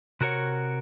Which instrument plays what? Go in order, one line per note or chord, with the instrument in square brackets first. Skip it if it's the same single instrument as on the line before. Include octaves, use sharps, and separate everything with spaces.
[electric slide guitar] C3 F#4 A#4 C#5 F#5